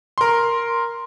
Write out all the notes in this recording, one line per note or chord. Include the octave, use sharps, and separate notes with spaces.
A#4 C6